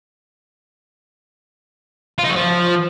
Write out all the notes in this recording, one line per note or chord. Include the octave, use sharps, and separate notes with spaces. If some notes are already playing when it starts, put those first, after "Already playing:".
F4
D#4
F#3
F3